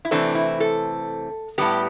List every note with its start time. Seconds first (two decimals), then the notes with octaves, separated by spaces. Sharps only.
0.05 E4
0.11 C3 E3 A3 C4 D4
0.35 E4
0.60 A4
1.58 A2 G3 B3 G4